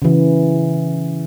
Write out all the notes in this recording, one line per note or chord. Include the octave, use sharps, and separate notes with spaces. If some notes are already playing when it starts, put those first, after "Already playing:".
C#3 E3